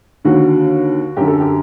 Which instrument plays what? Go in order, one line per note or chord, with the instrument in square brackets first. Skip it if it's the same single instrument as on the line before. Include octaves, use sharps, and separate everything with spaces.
[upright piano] D#2 D3 F#4
F#2 D3 G4
A4
G4